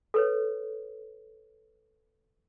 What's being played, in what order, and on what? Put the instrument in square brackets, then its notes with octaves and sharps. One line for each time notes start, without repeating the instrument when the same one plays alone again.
[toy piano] A4 B4 C#5